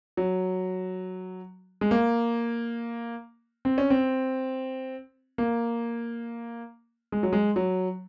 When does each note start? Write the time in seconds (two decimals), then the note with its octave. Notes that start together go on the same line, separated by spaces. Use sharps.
0.17 F#3
1.81 G#3
1.91 A#3
3.65 C4
3.78 C#4
3.90 C4
5.38 A#3
7.12 G#3
7.23 F#3
7.33 G#3
7.56 F#3